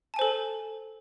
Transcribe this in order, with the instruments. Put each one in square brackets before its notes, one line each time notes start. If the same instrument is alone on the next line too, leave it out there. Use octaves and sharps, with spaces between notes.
[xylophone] A5
G#5
C5
A4